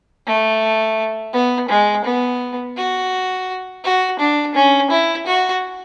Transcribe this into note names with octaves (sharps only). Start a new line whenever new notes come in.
A3
B3
G#3
B3
F#4
F#4
D4
C#4
E4
F#4